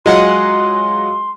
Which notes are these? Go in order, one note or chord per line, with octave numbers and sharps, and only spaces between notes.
F#3 G#3 F4 D#5 F#5 C6